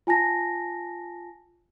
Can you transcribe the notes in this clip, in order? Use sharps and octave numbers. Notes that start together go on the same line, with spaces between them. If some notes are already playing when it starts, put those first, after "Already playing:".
F4 G#5 A5 A#6